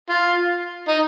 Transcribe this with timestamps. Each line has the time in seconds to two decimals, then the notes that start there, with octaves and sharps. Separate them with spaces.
0.10 F4
0.87 D#4